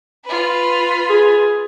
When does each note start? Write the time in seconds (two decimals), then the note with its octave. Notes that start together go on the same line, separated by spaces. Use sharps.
0.25 F4 B4
1.10 G#4